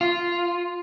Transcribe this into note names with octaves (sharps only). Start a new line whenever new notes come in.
F4